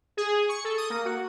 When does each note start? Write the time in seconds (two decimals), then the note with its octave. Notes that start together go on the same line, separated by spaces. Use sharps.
0.17 G#4
0.49 C#6
0.64 A4
0.77 D#6
0.90 A#3
1.05 F#4